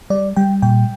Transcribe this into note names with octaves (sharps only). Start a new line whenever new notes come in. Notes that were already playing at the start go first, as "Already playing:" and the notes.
G3 D5
G3 G5
A#2 G5